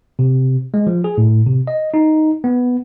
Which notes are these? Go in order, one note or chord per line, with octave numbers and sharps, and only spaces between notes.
C3
G#3
F3
G#4
A2
C3
D#5
D#4
B3